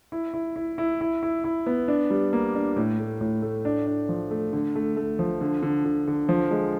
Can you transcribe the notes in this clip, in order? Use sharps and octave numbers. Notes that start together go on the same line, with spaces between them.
E4
E4
E4
E4
E4
E4
E4
B3
D4
G3
A#3
D4
A2
A3
A2
A3
D4
D4
F3
A3
D3
A3
A3
F3
D3
D3
D3
D3
F3
G#3